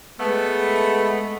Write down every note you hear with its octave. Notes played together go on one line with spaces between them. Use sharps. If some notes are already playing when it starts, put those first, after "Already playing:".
G#3 A3 B3